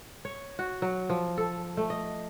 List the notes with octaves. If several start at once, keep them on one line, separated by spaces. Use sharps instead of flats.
C#5
F#4
F#3
F3
A4
A3
D#5